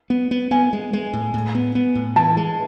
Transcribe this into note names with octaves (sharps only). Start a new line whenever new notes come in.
B3
B3
B3 G#5
G#3
G#3
A2
A2
B3
B3
A2
E3 A5
G#3